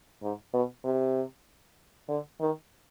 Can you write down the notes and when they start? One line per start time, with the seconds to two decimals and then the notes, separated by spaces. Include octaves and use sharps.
0.22 G#2
0.53 B2
0.84 C3
2.09 D3
2.40 D#3